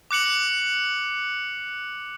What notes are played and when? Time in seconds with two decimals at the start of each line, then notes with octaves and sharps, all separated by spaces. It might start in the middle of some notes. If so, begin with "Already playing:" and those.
0.11 D6 F#6 C#7 F#7